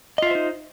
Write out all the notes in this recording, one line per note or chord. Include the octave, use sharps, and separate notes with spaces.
D#4 F4 C5 D#5 E5